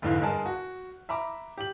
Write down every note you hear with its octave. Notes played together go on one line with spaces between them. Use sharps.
F1 G#2 D3 E3 F5
G2 G#3 G#4 A#4 A5
F#4
E5 A#5 B5 D6
G4 F#7